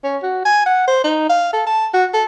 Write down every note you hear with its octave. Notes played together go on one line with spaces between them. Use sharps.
C#4
F#4
G#5
F#5
C5
D#4
F5
A4
A5
F#4
A4